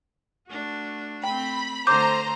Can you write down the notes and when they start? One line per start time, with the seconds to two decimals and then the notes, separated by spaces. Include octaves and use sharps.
0.48 A3 D4 F#4
1.24 A3 C4 G5 B5
1.87 D3 A3 C5 A#5 D6 G6